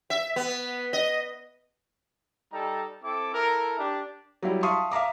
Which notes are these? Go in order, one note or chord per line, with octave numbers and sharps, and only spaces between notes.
E5
B3
D#5
G3 D#4 A4 A#5
C4 E4 A4 D6
E4 A4 A#4
D4 G4
F#3 G3 E4
E5 F5 A5 C6 C#6 D#6
E5 F5 A#5 D6